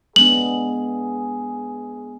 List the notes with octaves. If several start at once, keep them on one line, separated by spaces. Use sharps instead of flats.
G#3 B3 D4 G#4 F#7